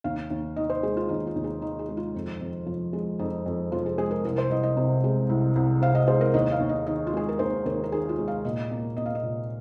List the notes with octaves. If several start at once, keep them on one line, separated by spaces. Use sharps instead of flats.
D#2 F5
D#2
D#3 D#5
C5
G#3 G#4
F4
D#2 D#4
F4
D#2
G#4
D#3 D#4
G#4
G#3
F4
F2
F2
F3
G#3
F2 D#4
F2
F3 F4
G#4
G#3 G#4
A#4
C2 A#4
C5
C2 D#5
D#5
C3
G#3
C2
C2
C3 F5
D#5
G#3 C5
A#4
D#2 D#5
F5
D#2
D#5
D#3 D#5
F4
G#3 G#4
A#4
D#2 C5
D#2 A#4
A#4
D#3 G#4
F4
G#3
F5
A#2 D#5
A#3
A#3 D#5
F5
D#5
A#2